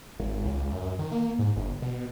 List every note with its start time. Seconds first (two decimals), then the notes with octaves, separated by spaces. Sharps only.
0.20 G#1
0.45 C#2
0.72 F#2
0.99 D#3
1.12 A#3
1.39 G#2
1.57 G1
1.82 B2